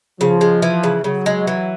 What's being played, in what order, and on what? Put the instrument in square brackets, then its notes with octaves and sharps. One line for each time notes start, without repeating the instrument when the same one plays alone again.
[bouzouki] C#3 [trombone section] F3
[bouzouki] G#3
E3
C#3
[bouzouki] C#3 [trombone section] F#3
[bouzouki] G#3
E3